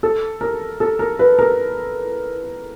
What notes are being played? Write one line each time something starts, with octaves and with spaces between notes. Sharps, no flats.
A4
A#4
A4
A#4
B4
A#4